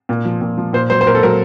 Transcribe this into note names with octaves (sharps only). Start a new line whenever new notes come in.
A#2
F3
A#2
F3
A#2 C5
F#3 C5
C5
A#2 A#4
A4
F#3 A#4